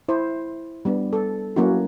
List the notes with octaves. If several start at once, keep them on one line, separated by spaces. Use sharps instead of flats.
E4 C5
G3 B3 D4
A4
F#3 A#3 C#4 E4 F#4